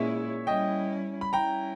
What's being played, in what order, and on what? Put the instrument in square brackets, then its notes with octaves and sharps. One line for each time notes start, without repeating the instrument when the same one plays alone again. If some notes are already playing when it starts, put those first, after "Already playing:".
Already playing: [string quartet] A#2 G#3 C#4 E4 [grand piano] C#5 E5
[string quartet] G3 C#4 E4 [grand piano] D#5 G5
[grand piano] B5
[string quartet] G3 C#4 E4 [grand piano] G5 A#5